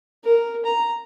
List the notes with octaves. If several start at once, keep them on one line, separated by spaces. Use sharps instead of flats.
A#4
A#5